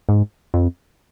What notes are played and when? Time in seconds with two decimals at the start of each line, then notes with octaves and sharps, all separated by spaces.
0.09 G#2
0.54 F2